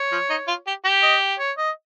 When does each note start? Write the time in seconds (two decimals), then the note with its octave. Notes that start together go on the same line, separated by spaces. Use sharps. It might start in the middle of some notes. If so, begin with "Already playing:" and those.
Already playing: C#5
0.12 F3
0.30 D#4
0.48 F4
0.67 G4
0.85 G4
1.03 D#5
1.39 C#5
1.58 D#5